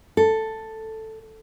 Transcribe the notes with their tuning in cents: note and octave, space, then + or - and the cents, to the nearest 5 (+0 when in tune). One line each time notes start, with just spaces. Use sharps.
A4 +5